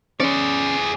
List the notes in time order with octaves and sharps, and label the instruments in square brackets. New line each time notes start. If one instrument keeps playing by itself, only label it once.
[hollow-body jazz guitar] C#4 C#5 [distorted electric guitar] G#4 D5